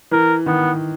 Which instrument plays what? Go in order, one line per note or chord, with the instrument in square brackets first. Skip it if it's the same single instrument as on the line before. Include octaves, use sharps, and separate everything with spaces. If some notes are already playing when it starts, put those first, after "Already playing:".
[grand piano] E3 [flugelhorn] A#4
[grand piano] D#3 [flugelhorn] B3